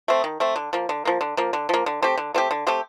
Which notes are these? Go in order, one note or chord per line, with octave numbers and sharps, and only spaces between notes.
A3 C4
D#3
A3 C4
D3
F3 A#3
D3
F3 A#3
D3
F3 A#3
D3
F3 A#3
D3
A3 C4 G4
D3
A3 C4 G4
D3
A3 C4 G4